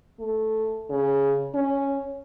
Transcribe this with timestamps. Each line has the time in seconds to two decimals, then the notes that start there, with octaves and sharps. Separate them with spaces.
0.20 A3
0.90 C#3
1.54 C#4